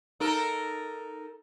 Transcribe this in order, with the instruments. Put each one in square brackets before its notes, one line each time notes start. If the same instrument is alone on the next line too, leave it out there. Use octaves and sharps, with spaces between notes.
[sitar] D#4 A4 A#4